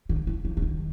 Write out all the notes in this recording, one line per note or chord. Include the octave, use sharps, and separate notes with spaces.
D#3
E3
E3
E3
D#3